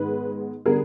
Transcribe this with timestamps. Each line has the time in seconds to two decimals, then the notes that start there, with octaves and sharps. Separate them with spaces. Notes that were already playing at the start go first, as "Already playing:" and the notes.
Already playing: G#2 D#3 G#3 B3 B4
0.66 D3 G3 B3 G#4 A#4